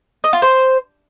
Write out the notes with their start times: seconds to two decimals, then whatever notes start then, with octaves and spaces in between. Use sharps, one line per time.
0.24 D#5
0.33 F4
0.42 C5